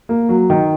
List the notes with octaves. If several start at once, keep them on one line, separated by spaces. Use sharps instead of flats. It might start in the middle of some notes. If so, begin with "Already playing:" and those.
A#3
F#3
D#3